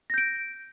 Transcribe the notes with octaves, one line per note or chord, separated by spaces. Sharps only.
G6 A#6 D7